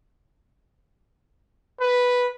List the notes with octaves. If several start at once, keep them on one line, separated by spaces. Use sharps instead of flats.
B4